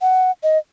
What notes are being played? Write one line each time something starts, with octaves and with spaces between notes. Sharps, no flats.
F#5
D#5